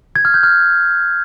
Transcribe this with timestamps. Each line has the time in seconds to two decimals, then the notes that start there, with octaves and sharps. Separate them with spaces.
0.16 G#6
0.25 F6
0.34 G6
0.43 F6